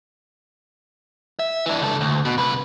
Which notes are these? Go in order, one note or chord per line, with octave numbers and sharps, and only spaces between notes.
E5
E3 D4
C#2 A4
D2
B2
C2 B4